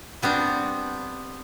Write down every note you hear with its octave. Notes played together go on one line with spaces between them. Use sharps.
G3 B3 C4 D4